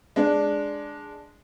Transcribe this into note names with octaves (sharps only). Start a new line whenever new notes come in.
G#3 D4